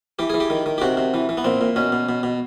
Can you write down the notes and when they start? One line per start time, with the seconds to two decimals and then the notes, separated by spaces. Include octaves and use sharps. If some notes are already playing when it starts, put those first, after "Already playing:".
0.19 E3 G4
0.30 E3 G#4
0.40 G4
0.50 D#3
0.66 D#3
0.78 G4
0.81 C3 F#4
0.97 C3
1.14 E3
1.29 E3
1.37 B3
1.44 A#2 C4
1.61 A#2
1.76 B2 C#4
1.92 B2
2.09 B2
2.23 B2